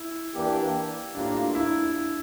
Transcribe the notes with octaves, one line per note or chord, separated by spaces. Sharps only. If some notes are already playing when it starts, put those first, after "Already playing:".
Already playing: E4
E3 A#3 D4 G4
A2 G3 A#3 D4 F4
E4